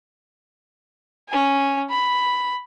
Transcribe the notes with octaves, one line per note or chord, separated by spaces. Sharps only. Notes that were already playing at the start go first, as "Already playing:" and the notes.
C#4 G#5
B5